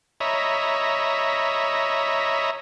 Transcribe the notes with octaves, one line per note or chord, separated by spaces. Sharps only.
C#5 D#5 E5 A#5 B5